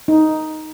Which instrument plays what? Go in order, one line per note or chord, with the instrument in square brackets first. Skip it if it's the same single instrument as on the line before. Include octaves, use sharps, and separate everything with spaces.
[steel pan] D#4